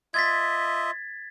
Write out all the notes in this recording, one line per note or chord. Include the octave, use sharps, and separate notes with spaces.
F4 D#5 E5 G#6 A6 B6